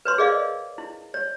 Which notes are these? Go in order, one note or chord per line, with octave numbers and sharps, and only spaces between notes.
B4 C#5 C6
G#4 A#4 D5 D#5 F5
E4
C#5